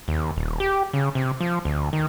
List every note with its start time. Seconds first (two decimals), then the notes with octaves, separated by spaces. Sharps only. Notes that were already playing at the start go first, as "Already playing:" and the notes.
0.08 D#2
0.36 D#1
0.60 G4
0.93 C#3
1.15 C3
1.41 F3
1.65 D2
1.93 D#3